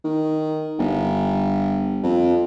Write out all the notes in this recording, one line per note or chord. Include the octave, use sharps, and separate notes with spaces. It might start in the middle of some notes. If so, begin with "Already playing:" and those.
D#3
G1
F2